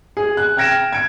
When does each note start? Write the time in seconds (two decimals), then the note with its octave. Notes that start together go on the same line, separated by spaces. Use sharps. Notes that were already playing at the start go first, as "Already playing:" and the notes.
0.17 G#4
0.37 F#6
0.57 G5 F6 G#6 A#6 D7 E7
0.93 G#6 D7